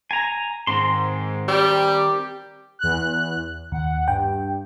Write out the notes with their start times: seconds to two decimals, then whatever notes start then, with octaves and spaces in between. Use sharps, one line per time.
0.11 G#5 A#5
0.67 G#2 D#3 C4 C6
1.48 G3 G4
2.79 E2 F#6
3.72 D#2 F#5
4.08 G2 G5